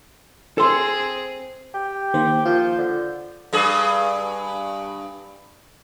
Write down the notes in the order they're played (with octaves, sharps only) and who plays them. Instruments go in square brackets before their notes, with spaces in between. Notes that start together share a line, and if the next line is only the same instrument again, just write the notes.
[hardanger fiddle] C4 G#4 [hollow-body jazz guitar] A4 C6
[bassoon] G4
[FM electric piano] D#3 A#3 C5
[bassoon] F3 [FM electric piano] F4 G6
[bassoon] D3
[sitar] G2 G#4